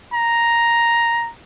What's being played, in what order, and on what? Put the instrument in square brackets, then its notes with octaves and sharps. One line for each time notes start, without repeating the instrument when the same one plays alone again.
[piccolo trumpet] A#5